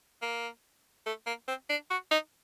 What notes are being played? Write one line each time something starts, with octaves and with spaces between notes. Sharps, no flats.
A#3
A3
A#3
C4
D4
F#4
D#4